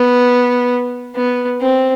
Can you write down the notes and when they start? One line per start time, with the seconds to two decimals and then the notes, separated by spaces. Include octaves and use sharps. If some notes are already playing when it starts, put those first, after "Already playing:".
Already playing: B3
1.15 B3
1.60 C4